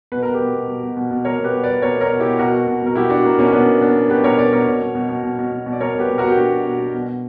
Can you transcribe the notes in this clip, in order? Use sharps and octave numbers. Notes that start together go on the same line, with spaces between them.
B2 B4
B2 A#4
G4 B4
B2
B2
B2
B2
B2
B2
B2 A#4 C#5
B2
G4 B4
B2
B4 D5
B2
B2 A#4 C#5
B2 A#4 C#5
B2
E4 G4
B2
B2 F#4 A#4
B2
B2
B2 A#4
B2 E4 G4
B2 D4 F#4
B2 A#3
B2 A#3 C#4
B2 B3 D4
B2
B2 B3 D4
B2
B2 G4 B4
B2 A#4 C#5
B2 B4 D5
B2 A#4 C#5
B2
B2
B2
B2
B2
B2
B2
B2
D5
B2 A#4 C#5
B2 G4 B4
B2
F#4 A#4
B2
G4
B2 D4 F#4
B2
B2
B2
B2
B2